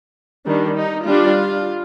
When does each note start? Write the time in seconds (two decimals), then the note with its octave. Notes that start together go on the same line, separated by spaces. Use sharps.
0.46 D#3 G3 D4
0.76 D#4
1.06 G3 D4 F4